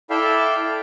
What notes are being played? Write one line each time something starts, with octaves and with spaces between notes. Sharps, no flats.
E4 A4 D5 E5 F5 G5